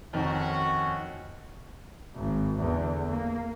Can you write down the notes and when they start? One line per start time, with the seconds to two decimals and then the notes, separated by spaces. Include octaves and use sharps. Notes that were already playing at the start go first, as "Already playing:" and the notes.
0.13 F2 D#3 C#4 F#4
2.15 G#1
2.59 E2 D3
3.08 A#3